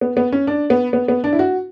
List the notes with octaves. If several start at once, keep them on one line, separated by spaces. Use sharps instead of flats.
B3
B3
C#4
D4
B3
B3
B3
D4
E4
F#4